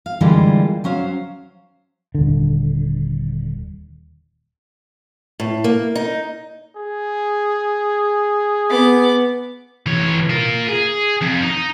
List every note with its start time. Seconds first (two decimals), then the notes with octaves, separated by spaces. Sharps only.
0.06 F5
0.21 D3 E3 G3 G#3 A#3 F4
0.84 F#3 C#4 C5 F5
2.15 D#1 D3
5.40 A2
5.64 A#3
5.95 D#4
6.77 G#4
8.70 B3 D6
9.86 E3 C#5
10.30 F4 A#4
10.69 G#4
11.22 F2
11.43 D#4